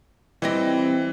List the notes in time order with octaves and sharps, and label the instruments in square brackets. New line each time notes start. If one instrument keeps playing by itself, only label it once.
[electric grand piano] E3 [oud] G3 C4 D#5